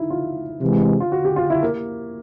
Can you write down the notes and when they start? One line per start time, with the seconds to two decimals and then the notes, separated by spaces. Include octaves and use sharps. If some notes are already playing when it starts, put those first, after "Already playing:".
Already playing: D#4 E4
0.10 F4
0.61 C3 E3 G#3
1.00 F4
1.12 F#4
1.25 G4
1.36 F4
1.50 E4
1.63 A#3